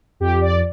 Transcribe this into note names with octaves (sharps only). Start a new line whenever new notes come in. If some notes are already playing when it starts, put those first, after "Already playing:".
F2 G4
D5